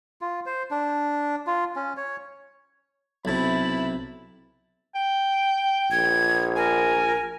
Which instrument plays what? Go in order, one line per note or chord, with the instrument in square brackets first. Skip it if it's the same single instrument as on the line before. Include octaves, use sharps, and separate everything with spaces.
[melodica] F4
C5
D4
F4
C#4
C#5
[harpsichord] B1 C3 [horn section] E4 A5 B5
[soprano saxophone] G5
[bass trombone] A#1 [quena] G#6
[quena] A#4 [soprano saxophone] G#5